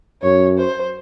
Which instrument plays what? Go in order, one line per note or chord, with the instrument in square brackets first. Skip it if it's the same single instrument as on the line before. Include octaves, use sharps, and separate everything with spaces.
[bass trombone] F#2 [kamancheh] C#5
[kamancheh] C5